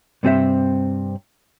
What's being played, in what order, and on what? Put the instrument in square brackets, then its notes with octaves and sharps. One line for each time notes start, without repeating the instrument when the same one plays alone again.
[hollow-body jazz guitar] G2 C3 C4 G#4 C5 E5